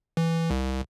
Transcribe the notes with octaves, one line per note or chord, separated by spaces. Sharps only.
E3
C2